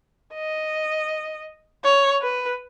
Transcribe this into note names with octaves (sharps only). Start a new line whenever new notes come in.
D#5
C#5
B4